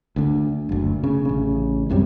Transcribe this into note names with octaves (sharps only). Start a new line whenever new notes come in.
D2 D3
F#1 D2
C#3
A1 C#3
C2 F#2 C3 G3